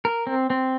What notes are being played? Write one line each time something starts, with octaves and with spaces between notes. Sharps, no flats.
A#4
C4
C4